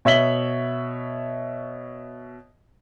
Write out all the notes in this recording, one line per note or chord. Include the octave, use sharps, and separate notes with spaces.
B2 C#5 E5 B6 F#7 G7